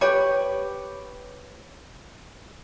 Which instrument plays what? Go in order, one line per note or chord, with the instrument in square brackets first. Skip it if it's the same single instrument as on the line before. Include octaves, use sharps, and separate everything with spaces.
[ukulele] G4 B4 C#5